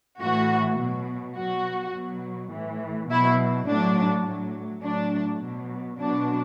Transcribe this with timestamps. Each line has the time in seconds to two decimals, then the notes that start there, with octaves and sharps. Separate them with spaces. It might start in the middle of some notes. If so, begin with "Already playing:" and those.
0.21 A2 E3 F#4
0.79 B2 F#3
1.37 B2 F#3 F#4
1.95 B2 F#3
2.52 A2 E3
3.10 B2 F#3 E4
3.68 A2 F#3 D4
4.26 A2 F#3
4.84 A2 F#3 D4
5.42 B2 F#3
5.99 B2 F#3 D4